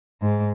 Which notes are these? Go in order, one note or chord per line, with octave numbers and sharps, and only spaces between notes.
G#2